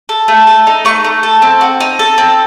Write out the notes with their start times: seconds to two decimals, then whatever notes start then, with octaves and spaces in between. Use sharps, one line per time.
0.09 A4
0.28 A3
0.47 A4
0.67 D#4
0.85 A3 C#6
1.04 A3
1.23 A4
1.42 C4
1.61 F#4
1.80 D#4
1.99 A4
2.18 C4